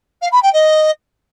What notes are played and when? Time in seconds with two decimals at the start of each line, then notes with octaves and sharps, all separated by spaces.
0.21 F5
0.32 B5
0.42 G5
0.53 D#5